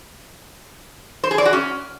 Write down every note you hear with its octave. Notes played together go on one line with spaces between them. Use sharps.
C5
G#4
D5
F#4
C#4